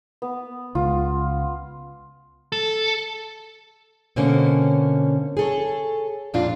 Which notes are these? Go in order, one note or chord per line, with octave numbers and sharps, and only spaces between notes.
B3
C#2 F4
A4
B2 D3 A#3 C4 C#4
G#4 A4 C#5
F2 A#2 D4 F4